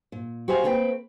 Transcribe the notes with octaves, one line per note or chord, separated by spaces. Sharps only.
A#2
F#4 G4 C5 F5 G#5
A3 A#3 C4 B4 G5